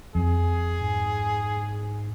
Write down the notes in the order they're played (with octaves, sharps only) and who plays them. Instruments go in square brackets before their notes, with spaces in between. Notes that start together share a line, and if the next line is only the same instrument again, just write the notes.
[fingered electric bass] F2 [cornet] G#4
[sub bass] G#2